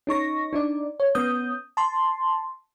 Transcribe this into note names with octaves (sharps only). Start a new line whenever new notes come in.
C#4 D#4 C#6 A#6
D4 D#4 D5
C#5
B3 C#4 D#6 G6
A5 C6